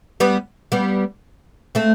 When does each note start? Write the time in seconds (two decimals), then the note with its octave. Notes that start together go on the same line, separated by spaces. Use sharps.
0.20 G3 B3
0.72 G3 B3
1.75 A3 C4